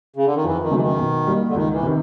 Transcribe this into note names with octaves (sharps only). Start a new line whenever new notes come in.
C#3
D3
D#3
F2 E3
D#3
C#3 E3 F#3 A3
D#3
B2
G3 A#3
D3
C#2 D#3
E3
C3 D#3